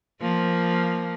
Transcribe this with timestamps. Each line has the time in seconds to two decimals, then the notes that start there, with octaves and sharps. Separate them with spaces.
0.21 F3 A#3